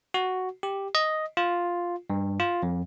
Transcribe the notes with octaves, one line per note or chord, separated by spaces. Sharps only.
F#4
G4
D#5
F4
G2
F4
F2